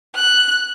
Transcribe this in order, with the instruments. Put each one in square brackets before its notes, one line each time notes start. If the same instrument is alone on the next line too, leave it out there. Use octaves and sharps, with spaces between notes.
[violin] F#6